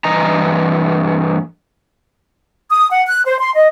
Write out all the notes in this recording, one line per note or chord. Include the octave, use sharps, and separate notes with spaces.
G2 E3 D#5 A#5
D#6
F#5
F#6
C5
C6
D#5